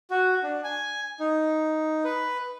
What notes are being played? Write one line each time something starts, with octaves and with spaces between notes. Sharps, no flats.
F#4
D4
G#5
D#4
B4